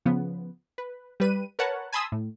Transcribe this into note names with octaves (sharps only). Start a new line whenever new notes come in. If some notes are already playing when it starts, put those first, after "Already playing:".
C#3 F3 B3
B4
G3 B4 D#7
A#4 B4 C#5 F#5 A5
G#5 A5 B5 C6 D#6 E6
A2